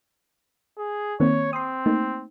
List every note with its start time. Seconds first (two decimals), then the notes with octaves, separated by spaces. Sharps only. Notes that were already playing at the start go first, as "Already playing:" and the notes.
0.78 G#4
1.20 D#3 A#3 C4 C#5
1.53 C4 C6 D#6
1.86 A3 A#3 D#4